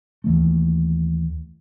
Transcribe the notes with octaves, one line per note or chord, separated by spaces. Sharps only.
D#2 E3 A3